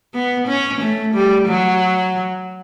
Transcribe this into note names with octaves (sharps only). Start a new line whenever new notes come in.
B3
C#4
A3
G3
F#3